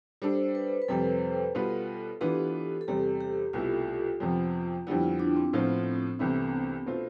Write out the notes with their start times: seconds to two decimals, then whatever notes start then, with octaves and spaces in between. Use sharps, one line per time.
0.22 G3 D4 A4 C5
0.55 B4
0.82 B4
0.88 F2 C3 G3 A4
1.55 B2 G3 B3 F4 B4
2.21 E3 B3 D4 F4 G4 B4
2.81 A4
2.88 E2 C3 G3 G4
3.21 G4
3.53 C2 B2 A3 E4 F4
4.20 F2 C3 F3 B3
4.87 F2 D3 G3 B3 E4
5.03 F4
5.19 D4
5.36 C4
5.53 A2 F3 B3 F4 C5
6.19 C2 C3 E3 A3 B3 E4
6.86 B2 A3 C4 F4